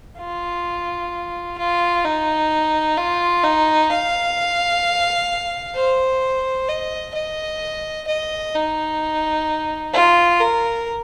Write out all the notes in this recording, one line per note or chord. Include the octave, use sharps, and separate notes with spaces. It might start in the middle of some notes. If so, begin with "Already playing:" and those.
F4
F4
D#4
F4
D#4
F5
C5
D#5
D#5
D#5
D#4
F4
A#4